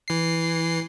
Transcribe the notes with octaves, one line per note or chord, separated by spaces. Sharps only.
E3 C7